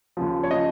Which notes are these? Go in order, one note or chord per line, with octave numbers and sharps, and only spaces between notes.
D#2 C#3 F3
C#5
C#3 F3 D#5